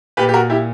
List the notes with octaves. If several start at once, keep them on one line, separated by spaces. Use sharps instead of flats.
A#2 G4 B4
G4
F#4 A#4
E4 G4